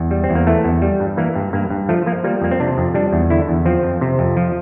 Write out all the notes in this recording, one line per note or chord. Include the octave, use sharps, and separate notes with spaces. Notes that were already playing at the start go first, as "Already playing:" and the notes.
Already playing: E2
G3
C4
E2
A#3
E3 A3
E2
G3
G2
E3 A#3
G2
G2 A#3
G2
F3 A3
F3 A#3
G3 A#3
F2 A#3
C4
C3 D4
F2
G3 D4
E2
D3 E4
E2
F3 C4
F2
C3
F2
F3